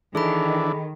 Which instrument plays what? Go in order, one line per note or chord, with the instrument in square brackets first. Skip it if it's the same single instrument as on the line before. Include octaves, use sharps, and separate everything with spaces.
[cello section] D#3 [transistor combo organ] E3 D4 [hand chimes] G#4 A4 B5